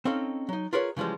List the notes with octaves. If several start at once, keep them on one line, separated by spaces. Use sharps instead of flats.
C4 C#4 D#4 A4 F5
F#3 D#4
F4 G#4 A#4 B4 C#5
C#3 E3 F3 G3 G#3